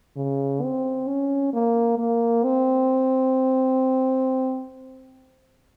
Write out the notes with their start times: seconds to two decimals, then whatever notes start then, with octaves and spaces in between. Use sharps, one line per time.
0.17 C#3
0.63 C4
1.08 C#4
1.53 A#3
1.98 A#3
2.44 C4